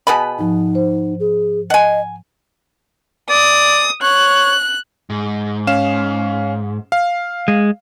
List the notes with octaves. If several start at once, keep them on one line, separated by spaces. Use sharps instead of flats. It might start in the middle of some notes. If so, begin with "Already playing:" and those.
B2 B3 G#4 G#5 A5 B5
G#2 F3 D#4
C5
G#4
D#5 F#5 G#5
D5 D#6
C#5 F#6
G#2
C#4 F5 E7
F5
G#3